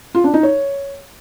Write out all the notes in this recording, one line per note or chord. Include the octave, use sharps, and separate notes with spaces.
F4
D4
D#4
C#5